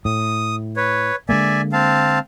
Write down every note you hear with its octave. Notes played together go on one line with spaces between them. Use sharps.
A2 D#6
B4 C#5
D3 G#3 A#3 D5 E5 G#5
C4 F5 A5